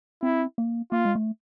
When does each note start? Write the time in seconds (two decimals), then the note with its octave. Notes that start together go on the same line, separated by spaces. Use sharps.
0.23 C4 E4
0.58 A#3
0.92 A#3 F4
1.05 G#3
1.15 A3